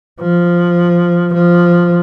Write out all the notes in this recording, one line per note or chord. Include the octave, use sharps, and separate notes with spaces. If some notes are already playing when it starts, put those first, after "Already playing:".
F3
F3